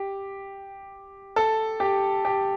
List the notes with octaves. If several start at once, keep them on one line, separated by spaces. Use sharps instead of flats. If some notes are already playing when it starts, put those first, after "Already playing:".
Already playing: G4
A4
G4
G4